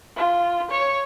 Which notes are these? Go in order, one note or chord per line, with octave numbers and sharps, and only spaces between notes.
F4
C#5